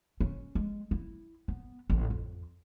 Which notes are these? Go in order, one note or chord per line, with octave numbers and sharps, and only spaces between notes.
C#4
G#3
E4
B3
A1
F2